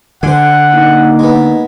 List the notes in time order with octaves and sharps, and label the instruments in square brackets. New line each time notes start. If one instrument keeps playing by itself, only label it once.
[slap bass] D3 [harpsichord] C5 G#5 [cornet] F#5
[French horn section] A#3 D#4
[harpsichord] G#3 B3